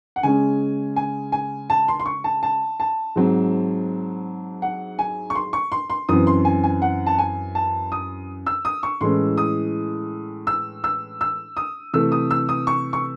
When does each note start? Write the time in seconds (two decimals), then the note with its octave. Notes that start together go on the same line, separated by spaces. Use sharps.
0.16 F#5
0.23 C#3 G#3 C#4 G#5
0.96 G#5
1.32 G#5
1.70 A5
1.88 C6
2.00 C6
2.06 C#6
2.24 A5
2.43 A5
2.80 A5
3.16 G#2 F#3 C4
4.62 F#5
4.99 G#5
5.30 C#6
5.35 C6
5.53 C#6
5.72 C6
5.90 C6
6.09 F#2 E3 C4 D#6
6.27 C6
6.45 G#5
6.64 G#5
6.82 F#5
7.07 A5
7.19 G#5
7.55 A5
7.92 D#6
8.46 E6
8.65 D#6
8.83 C#6
9.01 A2 E3 G#3 C#4 C6
9.38 D#6
10.47 E6
10.84 E6
11.21 E6
11.57 D#6
11.94 C3 E3 A3 E6
12.12 D#6
12.31 E6
12.49 D#6
12.67 C#6
12.93 C#6